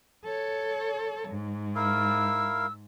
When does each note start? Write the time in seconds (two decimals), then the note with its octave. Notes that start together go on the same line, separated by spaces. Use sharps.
0.25 A4 C#5
1.28 G#2
1.76 E4 A#4 F5 E6